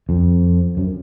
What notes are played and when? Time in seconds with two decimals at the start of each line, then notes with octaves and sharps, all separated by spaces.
0.09 F2
0.77 F#2